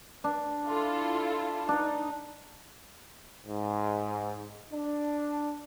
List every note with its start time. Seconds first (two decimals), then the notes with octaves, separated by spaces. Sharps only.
0.24 D4
0.67 E4 F4 A4
1.69 D4 D#4
3.47 G#2
4.73 D4